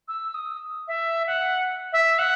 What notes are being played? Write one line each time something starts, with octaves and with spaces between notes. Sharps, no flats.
E6
D#6
E5
F#5
E5
F#5